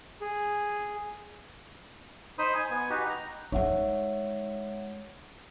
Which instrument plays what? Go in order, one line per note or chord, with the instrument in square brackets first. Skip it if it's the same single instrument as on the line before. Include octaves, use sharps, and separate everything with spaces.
[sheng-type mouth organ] G#4
[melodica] D#4 C5 B5 D#6
G#5
B3 G#5
D#4 F#4 G4 B4
A#5
[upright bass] G#3 D#4 [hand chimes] C#5 E5 F#5